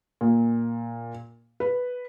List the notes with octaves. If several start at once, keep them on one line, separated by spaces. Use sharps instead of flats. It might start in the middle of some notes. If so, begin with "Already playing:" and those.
A#2
B4